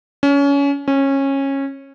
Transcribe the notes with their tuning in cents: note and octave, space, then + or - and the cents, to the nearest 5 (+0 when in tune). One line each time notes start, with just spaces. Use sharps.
C#4 +25
C#4 -20